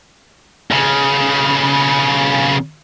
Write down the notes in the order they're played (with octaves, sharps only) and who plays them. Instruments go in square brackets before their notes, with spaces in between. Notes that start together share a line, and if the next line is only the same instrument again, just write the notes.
[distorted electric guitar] B1 C#3